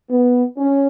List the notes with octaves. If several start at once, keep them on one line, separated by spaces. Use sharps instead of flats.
B3
C#4